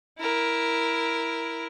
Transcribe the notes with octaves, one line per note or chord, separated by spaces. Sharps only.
E4 A#4